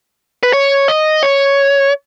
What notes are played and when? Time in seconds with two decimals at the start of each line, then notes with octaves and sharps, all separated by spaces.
0.43 B4
0.53 C#5
0.88 D#5
1.23 C#5